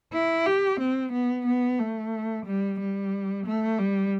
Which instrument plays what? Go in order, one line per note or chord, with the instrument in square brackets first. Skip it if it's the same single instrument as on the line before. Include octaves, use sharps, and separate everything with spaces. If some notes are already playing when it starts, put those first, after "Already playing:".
[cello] E4
G4
C4
B3
B3
A3
G3
G3
A3
G3